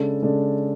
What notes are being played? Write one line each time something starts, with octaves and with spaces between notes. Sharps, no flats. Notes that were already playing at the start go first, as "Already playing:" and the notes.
Already playing: C#3 G#3 D4 A4
C#3 G#3 D4 A4